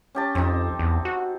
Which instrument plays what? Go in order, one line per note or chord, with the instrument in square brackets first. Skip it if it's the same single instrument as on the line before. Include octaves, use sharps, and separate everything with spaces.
[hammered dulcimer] C#4 G4 A5
[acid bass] F2 [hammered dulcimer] C4 D#4
[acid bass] E2
F#4